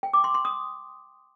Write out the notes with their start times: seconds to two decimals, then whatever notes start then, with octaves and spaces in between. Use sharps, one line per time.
0.03 G5
0.13 D6
0.24 C6
0.34 C6
0.45 D#6